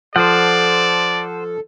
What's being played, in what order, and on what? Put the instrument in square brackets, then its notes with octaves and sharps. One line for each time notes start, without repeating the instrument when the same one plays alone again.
[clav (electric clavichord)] F3 [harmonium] A4 [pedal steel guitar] C5 F#5 [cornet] D5